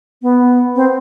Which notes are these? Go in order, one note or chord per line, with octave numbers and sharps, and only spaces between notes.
B3
C4